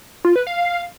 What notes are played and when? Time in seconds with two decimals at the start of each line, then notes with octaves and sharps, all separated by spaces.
0.25 F4
0.36 B4
0.47 F5